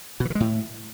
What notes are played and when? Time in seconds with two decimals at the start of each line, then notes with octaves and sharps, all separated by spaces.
0.20 B2
0.25 E3
0.30 D#3
0.35 G#3
0.40 A2